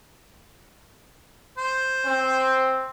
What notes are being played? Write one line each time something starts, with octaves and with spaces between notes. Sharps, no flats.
C5
C4